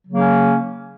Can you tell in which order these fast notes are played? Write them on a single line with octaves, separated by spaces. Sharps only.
F#3 C#3 A#3 C#4